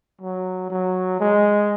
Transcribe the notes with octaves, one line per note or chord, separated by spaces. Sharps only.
F#3
F#3
G#3